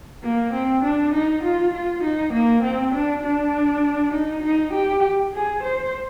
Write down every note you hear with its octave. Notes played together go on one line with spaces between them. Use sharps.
A#3
C4
D4
D#4
F4
F4
D#4
A#3
C4
D4
D4
D#4
D#4
G4
G#4
C5